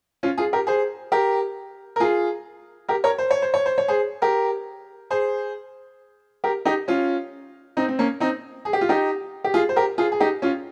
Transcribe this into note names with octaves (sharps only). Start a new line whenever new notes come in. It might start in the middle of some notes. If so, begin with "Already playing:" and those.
C#4 F4
F4 G#4
G4 A#4
G#4 C5
G4 A#4
A#4
F4 G#4
G4 A#4
A#4 C#5
C5
C#5
C5
C#5
C5
C#5
G#4 C5
G4 A#4
G#4 C5
G4 A#4
D#4 G4
C#4 F4
C4 D#4
C4
A#3 C#4
C4 D#4
G#4
G4
F4
D#4 G4
G4
F4 G#4
C5
G4 A#4
F4 G#4
G#4
D#4 G4
C#4 F4